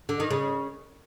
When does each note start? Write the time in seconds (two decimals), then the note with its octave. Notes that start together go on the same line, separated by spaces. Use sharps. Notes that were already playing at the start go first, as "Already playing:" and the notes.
0.09 D3
0.20 D#3
0.31 C#3